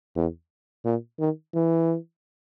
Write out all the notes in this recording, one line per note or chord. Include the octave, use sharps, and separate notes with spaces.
E2
A#2
D#3
E3